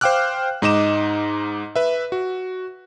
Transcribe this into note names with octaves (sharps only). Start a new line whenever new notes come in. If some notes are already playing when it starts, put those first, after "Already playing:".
C5 F5 G5 D6 F6 F#6
G#2 D#4 D#5 D6 E7
B4 E5
F#4